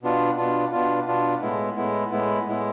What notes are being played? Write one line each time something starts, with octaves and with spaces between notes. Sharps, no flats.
B2 B3 D4 F4
B2 B3 D4 F4
B2 B3 D4 F4
B2 B3 D4 F4
A2 G#3 B3 E4
A2 G#3 B3 E4
A2 G#3 B3 E4
A2 G#3 B3 E4